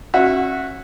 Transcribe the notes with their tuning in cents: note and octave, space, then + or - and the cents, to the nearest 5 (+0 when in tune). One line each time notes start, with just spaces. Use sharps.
C#4 -30 F#4 -10 E5 +0